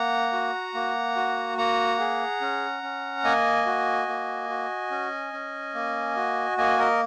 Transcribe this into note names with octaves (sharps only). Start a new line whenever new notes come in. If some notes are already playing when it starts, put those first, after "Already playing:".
Already playing: A#3 F#5 A#5
F#4
A#3
F#4
A#3 F#5 A#5
G#4
C#4
C#4
A#3 D#5 G#5
F#4
A#3
F#4
C#4
C#4
A#3
F#4
A#3 D#5 G#5
A#4 D#5